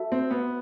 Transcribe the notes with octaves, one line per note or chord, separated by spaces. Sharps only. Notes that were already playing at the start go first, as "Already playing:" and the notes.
Already playing: F#4 A4 E5 A5
C4
B3